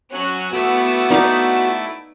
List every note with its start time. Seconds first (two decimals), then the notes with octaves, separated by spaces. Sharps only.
0.12 F#3 C#4 F#4 F#6
0.53 A3 B3 E4 F#4 D6 E6
1.10 D#4 D5 F5